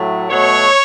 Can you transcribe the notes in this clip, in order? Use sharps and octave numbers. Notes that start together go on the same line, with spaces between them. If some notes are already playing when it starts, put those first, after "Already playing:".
Already playing: A2 F#3 A3
B2 F#3 A3 C#5